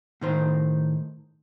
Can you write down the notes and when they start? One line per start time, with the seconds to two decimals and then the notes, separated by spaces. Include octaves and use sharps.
0.21 A2 D#3 C5